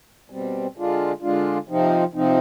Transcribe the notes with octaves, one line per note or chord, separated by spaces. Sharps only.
B2 G3 C4
D3 G#3 D4 F4
D3 G#3 D4 F4
C3 F3 C4 D#4
C3 F3 C4 D#4